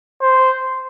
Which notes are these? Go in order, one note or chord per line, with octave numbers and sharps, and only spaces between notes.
C5